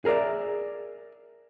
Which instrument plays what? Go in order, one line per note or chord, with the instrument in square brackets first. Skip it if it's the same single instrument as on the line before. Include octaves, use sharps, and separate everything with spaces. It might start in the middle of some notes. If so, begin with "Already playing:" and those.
[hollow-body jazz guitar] G#4 A#4 C#5 D5 E5